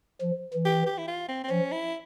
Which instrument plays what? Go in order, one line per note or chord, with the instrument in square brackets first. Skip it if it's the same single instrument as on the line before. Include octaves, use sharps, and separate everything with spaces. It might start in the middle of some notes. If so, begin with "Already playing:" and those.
[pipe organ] F3
E3
[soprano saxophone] G4
G4
E4
F4
C4
C4
[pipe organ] F3 [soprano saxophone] C#4
[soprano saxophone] E4